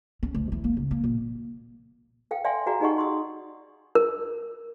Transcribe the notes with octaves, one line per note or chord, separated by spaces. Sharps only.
C#4
D2
E3
A#3
C#2
A#3
A#2
A4 F5 G5
D5 E5 F5 G5 G#5 C6
F#4 G#4 D5 F5 A#5
D#4 G4 G#4 D#5 F#5 C#6
C6 C#6 D#6
A#4